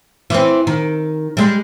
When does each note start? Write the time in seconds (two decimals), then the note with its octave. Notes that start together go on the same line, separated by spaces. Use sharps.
0.30 E3 C4
0.67 D#3
1.37 G3 G#3